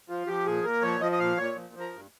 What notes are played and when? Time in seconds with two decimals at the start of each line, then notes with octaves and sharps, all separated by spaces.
0.09 F3 F4
0.27 F3 G4
0.46 A#2 G#4
0.64 A#2 A#4
0.82 F3 C#5
1.00 F3 D#5
1.12 D#5
1.19 A#2 F5
1.37 A#2 C#5
1.56 F3
1.74 F3
1.80 A#4
1.93 G2